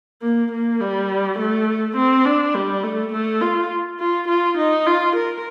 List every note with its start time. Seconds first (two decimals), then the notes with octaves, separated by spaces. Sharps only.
0.22 A#3
0.51 A#3
0.80 G3
1.39 A3
1.96 C4
2.25 D4
2.54 G3
2.83 A3
3.12 A3
3.41 F4
3.99 F4
4.27 F4
4.57 D#4
4.86 F4
5.16 A#4